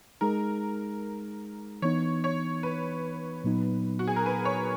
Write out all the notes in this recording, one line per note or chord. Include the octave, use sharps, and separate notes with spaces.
G#3 D#4 G#4 A#4
E3 B3 D#4 C#5
C#5
B4
A#2 F#3 B3 D#4
F#4
G#4
A#4
B4
C#5